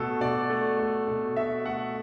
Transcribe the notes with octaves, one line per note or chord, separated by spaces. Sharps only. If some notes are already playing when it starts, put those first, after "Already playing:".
Already playing: B2 A3 A4
B2 D5
A3
A3
B2
B2 E5
A3 F#5